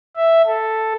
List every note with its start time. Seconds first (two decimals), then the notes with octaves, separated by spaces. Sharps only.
0.17 E5
0.47 A4